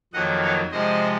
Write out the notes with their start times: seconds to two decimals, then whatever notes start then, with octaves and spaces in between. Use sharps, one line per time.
0.13 F2 D#3 F#3 A#3 D#5 F#5
0.42 C#5 F5
0.72 C3 F3 G#3 C5 D#5